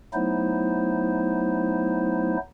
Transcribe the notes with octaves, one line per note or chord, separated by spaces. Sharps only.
F#3 A3 B3 D#4 E4 C5